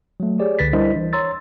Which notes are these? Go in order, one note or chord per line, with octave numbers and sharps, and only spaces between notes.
F#3 A3
G4 G#4 C#5 D5
C#2 D3 B4 A6 B6
G3 D4 E4 A#4 C5 D#5
E3
C#5 A#5 C6 E6 A6